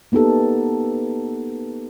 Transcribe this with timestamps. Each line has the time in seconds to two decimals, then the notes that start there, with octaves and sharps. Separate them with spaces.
0.12 A#3 B3 D#4 G4 A4